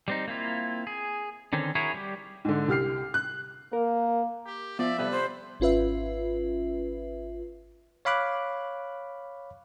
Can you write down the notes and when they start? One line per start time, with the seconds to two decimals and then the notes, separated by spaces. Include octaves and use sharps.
0.08 G3 C4 D#4
0.28 A#3 C4 E4 F4
0.87 G#4
1.53 D3 D#3 C4 C#4
1.75 E4 F#4 G#4 A#4 C#5
1.94 G3 G4
2.45 G#2 D3
2.68 C2 G4 F6 C7
3.14 F#6
3.73 A#3 A#4
4.46 G4
4.79 F3 B3 D5 E5
4.99 C3 G3 B3 A4 B4
5.11 C5
5.60 G#1 C#4 F4 B4 E5
8.05 C#5 F5 B5 D6 F#6